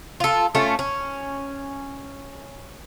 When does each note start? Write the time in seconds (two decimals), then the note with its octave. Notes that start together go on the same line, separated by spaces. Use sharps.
0.20 F4 A4
0.55 A3 C#4 F4
0.79 C#4